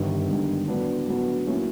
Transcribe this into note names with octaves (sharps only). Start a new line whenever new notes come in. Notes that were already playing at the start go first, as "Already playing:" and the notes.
Already playing: G1 G2 D#3
G1 G2 D#3
A2 F#3 B3 D4
A2 F#3 B3 D4
A#2 F#3 A#3 C#4 E4